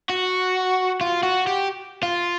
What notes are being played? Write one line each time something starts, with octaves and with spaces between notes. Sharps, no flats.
F#4
F4
F#4
G4
F4